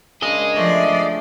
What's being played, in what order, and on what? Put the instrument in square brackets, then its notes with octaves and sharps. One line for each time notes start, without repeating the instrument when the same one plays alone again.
[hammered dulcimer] C#3 D4 A#4 [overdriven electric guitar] G#4 D#5
[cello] F3 D5 [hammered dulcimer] A3